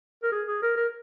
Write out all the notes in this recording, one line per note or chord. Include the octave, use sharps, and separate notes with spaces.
A#4
G#4
G#4
A#4
A#4